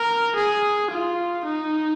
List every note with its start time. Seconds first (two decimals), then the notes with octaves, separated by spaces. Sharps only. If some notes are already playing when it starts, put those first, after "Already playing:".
Already playing: A#4
0.36 G#4
0.91 F4
1.45 D#4